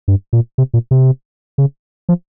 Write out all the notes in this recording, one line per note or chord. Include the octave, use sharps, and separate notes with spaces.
G2
A#2
C3
A#2
C3
C#3
F3